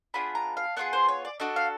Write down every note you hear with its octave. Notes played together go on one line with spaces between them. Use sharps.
B3 D4 F4 G#4 B5
A#5
F5
B3 D4 F4 G#4 F#5
C5
C#5
D5
D4 F#4 A4 D#5
F5